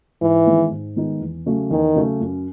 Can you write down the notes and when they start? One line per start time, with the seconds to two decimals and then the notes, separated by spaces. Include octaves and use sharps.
0.21 G#2 E3
0.46 D#3 G#3 B3 D#4
0.71 G#2
0.96 D#3 G#3 B3 D#4
1.21 E2
1.46 C#3 F#3 A3
1.71 E2 D#3
1.96 C#3 F#3 A3
2.21 F#2